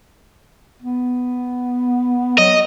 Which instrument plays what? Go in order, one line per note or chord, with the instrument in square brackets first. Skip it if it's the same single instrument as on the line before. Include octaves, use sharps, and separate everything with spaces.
[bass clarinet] B3
[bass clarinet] F#3 [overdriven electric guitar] D#5